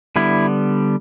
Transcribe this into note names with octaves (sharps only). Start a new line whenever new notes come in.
D3 G3 B3 E4